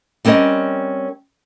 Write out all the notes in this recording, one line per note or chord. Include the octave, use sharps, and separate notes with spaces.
G3 C4 C#4 A#4 D#5